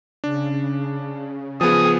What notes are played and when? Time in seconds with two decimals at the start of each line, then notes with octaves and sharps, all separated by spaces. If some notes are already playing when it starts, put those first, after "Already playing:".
0.24 C#3 D4
1.61 F3 B3 G#4 D#6